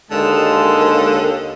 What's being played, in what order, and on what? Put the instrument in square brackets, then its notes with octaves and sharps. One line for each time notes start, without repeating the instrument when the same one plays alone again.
[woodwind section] D#2 [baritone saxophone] D3 [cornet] G#3 [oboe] A5